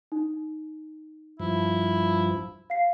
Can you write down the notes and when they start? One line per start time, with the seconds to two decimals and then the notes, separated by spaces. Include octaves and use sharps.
0.12 D#4
1.40 G2 F3 E4
2.70 F5 C7